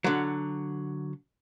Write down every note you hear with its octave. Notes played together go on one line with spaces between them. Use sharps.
D3 F#3